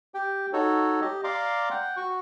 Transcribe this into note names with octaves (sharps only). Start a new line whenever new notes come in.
G4 G5
D#4 F#4 A4 C#5
G4 D#5
D5 F5 A#5 C6 D6
F#5 G5
F#4 C#6